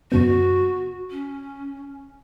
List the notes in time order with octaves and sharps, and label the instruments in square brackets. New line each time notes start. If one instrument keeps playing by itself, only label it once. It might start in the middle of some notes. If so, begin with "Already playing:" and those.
[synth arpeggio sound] F#2 C#3 B3 [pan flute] F#4
[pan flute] C#4